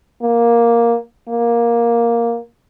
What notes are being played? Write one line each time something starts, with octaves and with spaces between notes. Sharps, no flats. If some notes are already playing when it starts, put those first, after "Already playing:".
A#3
A#3